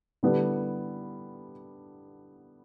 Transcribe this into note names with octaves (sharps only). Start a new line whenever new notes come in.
D3 G3 B3 E4